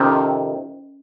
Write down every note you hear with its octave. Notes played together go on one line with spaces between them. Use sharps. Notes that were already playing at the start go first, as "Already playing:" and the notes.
Already playing: F2 C3 D#3 C#4